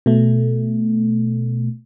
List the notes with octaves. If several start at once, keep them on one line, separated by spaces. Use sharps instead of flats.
B2 A3